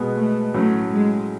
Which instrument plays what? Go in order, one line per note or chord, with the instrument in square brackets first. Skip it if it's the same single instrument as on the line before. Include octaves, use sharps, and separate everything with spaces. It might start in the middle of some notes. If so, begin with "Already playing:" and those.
Already playing: [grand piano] B2 G#3 B3
[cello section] A3
[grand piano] A2 F#3 C#4 [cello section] A3
[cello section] G#3